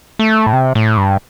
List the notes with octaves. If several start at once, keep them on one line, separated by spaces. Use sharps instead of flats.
A3
A2
C3
A2
G2